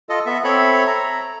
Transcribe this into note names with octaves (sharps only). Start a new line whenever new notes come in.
F4 A4 D#5
B3 E5
C4 A4 C#5 E5 B5
A#5